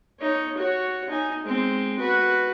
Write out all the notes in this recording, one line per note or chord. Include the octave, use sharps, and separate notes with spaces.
D#4 C#5
F#4 C#5
D#4 G#5
G#3 C4
F#4 B4